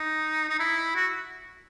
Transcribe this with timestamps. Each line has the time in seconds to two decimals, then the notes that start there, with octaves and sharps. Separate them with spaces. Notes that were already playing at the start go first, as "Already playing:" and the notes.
Already playing: D#4
0.49 D#4
0.59 E4
0.96 F#4